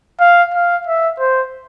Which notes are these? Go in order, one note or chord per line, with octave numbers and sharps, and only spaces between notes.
F5
F5
E5
C5